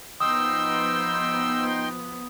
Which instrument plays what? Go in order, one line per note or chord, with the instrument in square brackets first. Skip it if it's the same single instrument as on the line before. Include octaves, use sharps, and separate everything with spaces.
[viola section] F3 B3 [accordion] D#4 G5 C6 [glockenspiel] D#6 [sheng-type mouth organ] E6